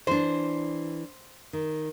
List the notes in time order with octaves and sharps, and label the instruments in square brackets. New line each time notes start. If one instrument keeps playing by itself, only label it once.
[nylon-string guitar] E3 D4 [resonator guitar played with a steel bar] C5
[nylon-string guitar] D#3